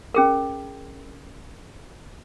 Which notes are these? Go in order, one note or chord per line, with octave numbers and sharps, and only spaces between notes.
C#4 G#4 A#4